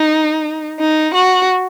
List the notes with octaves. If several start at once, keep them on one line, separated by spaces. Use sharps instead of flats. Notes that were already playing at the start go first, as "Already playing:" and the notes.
Already playing: D#4
D#4
F#4